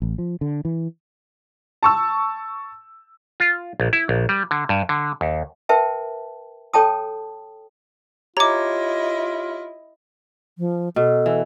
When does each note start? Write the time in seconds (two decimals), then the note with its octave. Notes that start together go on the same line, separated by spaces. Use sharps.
0.02 A1
0.18 F3
0.41 D3
0.65 E3
1.83 A5 C#6 E6
3.40 F4
3.80 A#1
3.93 E4
4.09 A#1
4.29 G3
4.51 D3
4.69 G2
4.89 D3
5.21 D#2
5.69 A#4 B4 E5 G5 A5
6.74 A4 C#5 G5 A5 D#6
8.37 E4 F4 G4 C#5 D#5 A#5 D6
10.58 F3
10.96 B2 A4
11.26 E3